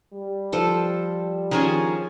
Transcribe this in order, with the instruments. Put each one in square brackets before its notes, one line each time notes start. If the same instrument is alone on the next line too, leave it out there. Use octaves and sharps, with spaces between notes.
[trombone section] G3
[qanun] F3 A4 C5
[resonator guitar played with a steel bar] D#3 F3 C#4 [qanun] G#4 G#5 A#5